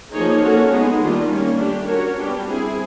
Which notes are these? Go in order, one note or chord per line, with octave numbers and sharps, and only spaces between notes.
F3 A#3 D#4 G#4 C#5
A#3 C#4 F#4 A4 C#5
G#3 B3 D#4 G#4
D#3 G3 A#3 D4 F4
G3 A#3 C#4
A3 D4 G4
C#4 F#4 A#4 C#5
G3 B3 D4 G4
C4 E4 G#4